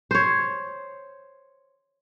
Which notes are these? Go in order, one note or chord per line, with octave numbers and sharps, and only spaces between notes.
C5 C#5